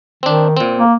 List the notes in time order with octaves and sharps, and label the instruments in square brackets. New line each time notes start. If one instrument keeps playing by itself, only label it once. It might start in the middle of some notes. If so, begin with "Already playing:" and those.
[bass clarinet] D#3 [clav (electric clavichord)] C4 D4
[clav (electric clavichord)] A#2 C4
[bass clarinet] A#3